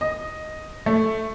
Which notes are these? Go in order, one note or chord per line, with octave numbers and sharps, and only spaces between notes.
D#5
A3